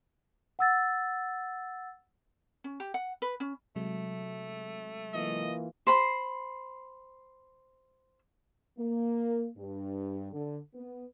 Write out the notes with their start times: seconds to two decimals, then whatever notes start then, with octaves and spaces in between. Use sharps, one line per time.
0.59 F#5 E6 A6
2.64 C#4
2.80 G4
2.94 F#5
3.22 B4
3.40 C#4
3.76 C3 F#3 G#3 A3
5.14 E3 A#3 F4 D#5
5.87 C5 B5 C6
8.78 A#3
9.57 G2
10.33 D3
10.74 B3